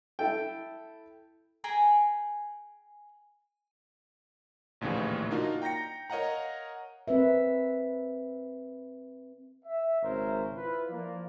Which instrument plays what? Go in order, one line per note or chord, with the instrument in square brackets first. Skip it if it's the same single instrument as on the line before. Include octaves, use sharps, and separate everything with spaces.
[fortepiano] E4 A4 G5
[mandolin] G#4 G5 G#5 A#5
[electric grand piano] A#1 D#2 A2 C#3 E3
A#3 D4 D#4 F4 F#4 A#4
G5 A#5 G6 A#6 C#7
A#4 C#5 D#5 F5 F#5 A#5
[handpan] C4 A#4 B4 E5
[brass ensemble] E5
G#1 C#3 A#4 C5 C#5 E5
E4 F4 B4
F3 A#3 D5